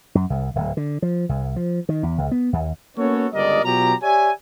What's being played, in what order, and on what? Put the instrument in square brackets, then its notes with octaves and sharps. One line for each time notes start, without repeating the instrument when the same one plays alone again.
[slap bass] F#2
C2
D1
D3
F3
C2
F3
D#3
E2
C#2
B3
D#2
[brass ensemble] A#3 B3 C#4 F#4 A4 C#5
G1 C#2 G3 A#4 D5 D#5
B2 F#3 F4 G4 A#5
G4 C#5 D5 E5 G#5